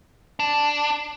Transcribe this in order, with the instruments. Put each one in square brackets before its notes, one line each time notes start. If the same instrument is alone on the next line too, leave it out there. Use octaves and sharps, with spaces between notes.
[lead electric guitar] D4